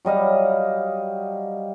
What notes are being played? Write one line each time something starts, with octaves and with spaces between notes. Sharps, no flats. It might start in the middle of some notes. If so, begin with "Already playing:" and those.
F#3 G3 D#5 F5